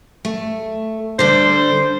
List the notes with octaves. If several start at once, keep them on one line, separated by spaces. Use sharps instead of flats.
A3
D3 G3 D4 C5